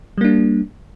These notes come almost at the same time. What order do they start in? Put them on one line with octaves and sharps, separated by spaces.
G3 A#3 D4